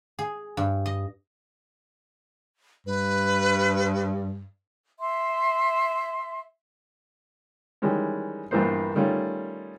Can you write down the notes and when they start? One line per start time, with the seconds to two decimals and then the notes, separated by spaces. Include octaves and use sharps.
0.19 G#4
0.57 G2
0.86 D#5
2.87 G2 B4
5.00 E5 C6
7.82 D#3 E3 G3 G#3 C#4
8.51 A#1 G2 E3 A#3 B3 C5
8.95 D#3 G3 A3 C#4 F4